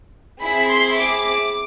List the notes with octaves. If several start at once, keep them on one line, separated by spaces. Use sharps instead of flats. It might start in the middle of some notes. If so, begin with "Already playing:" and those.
C4 E4 G#4 B5
C6
D6